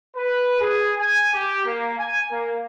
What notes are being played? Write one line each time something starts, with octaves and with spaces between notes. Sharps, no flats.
B4
G#4
G#5
G4
A#3
G#5
A#3